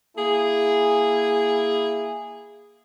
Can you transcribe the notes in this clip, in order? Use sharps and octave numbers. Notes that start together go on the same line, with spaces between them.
A#3 E4 G#4